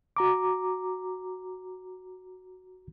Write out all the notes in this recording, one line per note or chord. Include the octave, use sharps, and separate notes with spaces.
F#4 A#5 D6